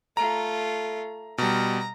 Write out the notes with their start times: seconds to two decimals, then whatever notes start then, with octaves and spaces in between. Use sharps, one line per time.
0.17 A3 F4 A#5
1.38 B2 G3 A#5